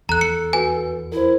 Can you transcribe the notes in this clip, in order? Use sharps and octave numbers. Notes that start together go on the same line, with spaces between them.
E2 A4 A#5 F#6
C#7
F#4 B4 G#5
E4 A#4 C5